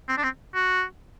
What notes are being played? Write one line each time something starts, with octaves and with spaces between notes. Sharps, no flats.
C4
D4
C4
F#4